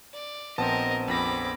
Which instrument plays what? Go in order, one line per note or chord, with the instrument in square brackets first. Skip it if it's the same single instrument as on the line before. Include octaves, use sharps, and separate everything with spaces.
[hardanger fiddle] D5
[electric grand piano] A#1 A5 [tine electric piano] B3 C4 C5 [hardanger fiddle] A#4 D#5
[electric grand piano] A#1 F2 A#6 [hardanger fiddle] B5 D6